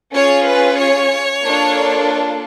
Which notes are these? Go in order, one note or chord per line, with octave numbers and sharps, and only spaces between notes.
C#4 F4 G#4 C#5
B4
C#5
A#3 D4 F4 A4